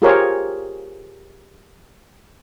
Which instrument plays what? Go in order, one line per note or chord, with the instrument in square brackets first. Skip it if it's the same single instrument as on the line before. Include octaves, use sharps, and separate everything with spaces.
[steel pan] F4 G4 G#4 A#4 C5 C#5